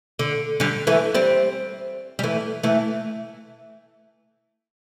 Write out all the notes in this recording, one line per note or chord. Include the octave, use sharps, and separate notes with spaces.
D3
D3 G3
E3 A3
G3 C4
G3
E3 A3
E3 A3